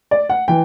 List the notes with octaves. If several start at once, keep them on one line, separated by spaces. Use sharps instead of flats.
D5
F#5
E3 G5